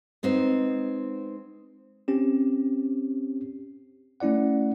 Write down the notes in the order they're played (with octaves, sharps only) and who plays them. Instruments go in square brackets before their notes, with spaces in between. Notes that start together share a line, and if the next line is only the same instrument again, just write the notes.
[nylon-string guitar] G#3 B3 C4 D#4 C5
[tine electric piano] C4 C#4 G4
A3 C#4 E4 D5 F#5